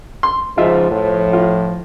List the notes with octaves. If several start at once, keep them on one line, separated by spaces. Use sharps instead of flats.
C6
G#2 C#3 F3 F4 D#5 E5
A2 F3
F4